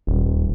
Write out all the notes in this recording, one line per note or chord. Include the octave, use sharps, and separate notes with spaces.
D#1